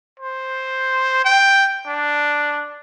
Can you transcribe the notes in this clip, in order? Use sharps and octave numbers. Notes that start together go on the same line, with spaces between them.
C5
G5
D4